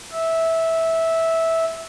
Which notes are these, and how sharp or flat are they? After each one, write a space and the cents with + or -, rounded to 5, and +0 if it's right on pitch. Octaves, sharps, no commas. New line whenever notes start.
E5 -10